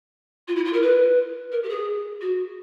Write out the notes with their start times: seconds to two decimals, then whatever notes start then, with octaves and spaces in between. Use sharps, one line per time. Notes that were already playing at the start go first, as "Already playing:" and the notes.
0.48 F4
0.56 E4
0.65 F4
0.73 A#4
0.82 B4
1.52 A#4
1.63 G4
1.69 G#4
2.21 F#4